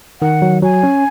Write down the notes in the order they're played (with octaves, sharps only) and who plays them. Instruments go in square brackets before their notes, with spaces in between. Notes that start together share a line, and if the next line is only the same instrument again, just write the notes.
[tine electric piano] D#3 [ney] F#5
[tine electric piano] F#3
[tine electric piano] F#3 [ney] G#5
[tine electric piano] C#4